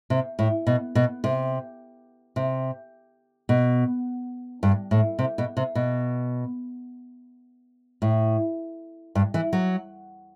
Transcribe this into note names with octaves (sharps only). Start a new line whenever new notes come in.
C3
A2
B2
B2
C3
C3
B2
G2
A2
C3
B2
C3
B2
A2
G2
E3
F#3